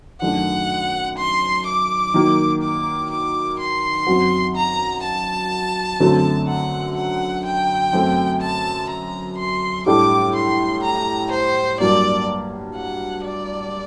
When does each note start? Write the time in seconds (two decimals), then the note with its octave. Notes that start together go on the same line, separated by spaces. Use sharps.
0.21 F#2 D#3 A3 D4 F#5
1.18 C6
1.66 D6
2.14 D#3 F#3 A#3
2.62 D6
3.10 D6
3.59 C6
4.07 F#2 F#3 C4 F#4
4.56 A#5
5.03 A5
6.00 F#2 D3 F#3 A3 C4
6.48 F#5
6.96 F#5
7.45 G5
7.93 F#2 F#3 A3 C4 F#4
8.41 A5
8.89 A#5
9.38 C6
9.86 A2 G3 D4 A4 D6
10.35 C6
10.83 A#5
11.31 C5
11.80 G2 F#3 A#3 D5
12.76 F#5
13.25 D5